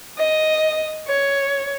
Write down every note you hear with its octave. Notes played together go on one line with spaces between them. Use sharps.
D#5
C#5